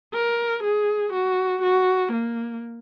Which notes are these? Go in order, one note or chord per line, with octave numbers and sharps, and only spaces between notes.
A#4
G#4
F#4
F#4
A#3